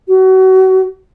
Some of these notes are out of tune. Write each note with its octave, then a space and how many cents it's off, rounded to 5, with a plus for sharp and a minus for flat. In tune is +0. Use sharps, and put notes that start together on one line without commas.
F#4 +30